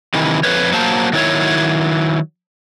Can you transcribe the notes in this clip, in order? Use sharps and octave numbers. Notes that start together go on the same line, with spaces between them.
C3 D#3 E3
F2 G#2 B4 C#5
F#3 A#3 C5 A5
D#3 F#3 E4 C#5